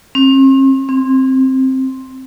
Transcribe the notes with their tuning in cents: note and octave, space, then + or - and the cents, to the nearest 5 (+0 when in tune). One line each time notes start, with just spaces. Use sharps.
C4 +45
C4 +10